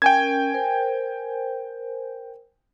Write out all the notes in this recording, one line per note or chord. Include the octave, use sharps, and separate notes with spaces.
C#4 A#4 G5 G#5 G#6
A#4 C5